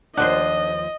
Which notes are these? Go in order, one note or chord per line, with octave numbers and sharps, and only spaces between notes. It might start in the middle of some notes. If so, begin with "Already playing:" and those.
D#2 F3 D4 C5 D#5 F#5